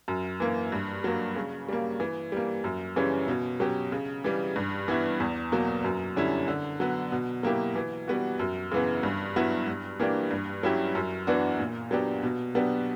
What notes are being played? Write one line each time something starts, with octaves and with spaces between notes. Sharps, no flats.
F#2
E3 A#3
G2
F#3 A#3
C#3
G3 A#3
E3
G3 A#3
F#2
C#3 E3 G3 C#4
B2
F#3 C#4 G4
C#3
E3 G3
G2
E3 B3 E4
E2
B2 F#3 A#3
F#2
D3 G3 C#4 E4
D3
F#3 B3
B2
F#3 A#3 E4 G4
E3
G3 B3 F#4
F#2
C#3 E3 B3
G2
F#3 B3 E4
G2
E3 A#3 D4 G4
G2
F#3 C#4 E4 G4
F#2
E3 B3 D4 F#4
A#2
F#3 B3 D4 G4
B2
F#3 B3 D4 G4